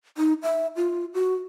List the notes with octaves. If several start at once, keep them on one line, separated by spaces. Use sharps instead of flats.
D#4
E5
F4
F#4